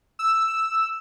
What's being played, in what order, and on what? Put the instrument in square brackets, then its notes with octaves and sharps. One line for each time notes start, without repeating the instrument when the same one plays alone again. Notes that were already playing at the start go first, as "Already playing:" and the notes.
[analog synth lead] E6